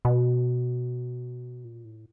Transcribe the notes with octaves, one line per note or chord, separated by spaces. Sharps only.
B2
A#2
A2